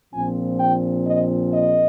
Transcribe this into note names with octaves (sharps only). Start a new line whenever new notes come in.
A#1 A#2 F3 C4 G#5
G5
D#5
D#5